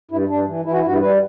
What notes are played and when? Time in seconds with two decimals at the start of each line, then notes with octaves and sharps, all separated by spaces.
0.11 G2 E4
0.29 G2 D4
0.47 E3
0.65 E3 E4
0.72 F#4
0.79 E4
0.84 G2 F#4
0.93 E4
1.01 G3 B4